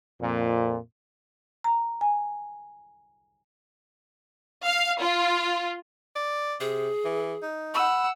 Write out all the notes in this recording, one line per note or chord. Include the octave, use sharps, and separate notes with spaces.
F2 A#2
A#5
G#5
F5
F4
D5
C3 G#4
E3
D#4
F#5 B5 E6